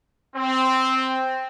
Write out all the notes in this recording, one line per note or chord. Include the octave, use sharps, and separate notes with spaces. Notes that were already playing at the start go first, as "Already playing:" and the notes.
C4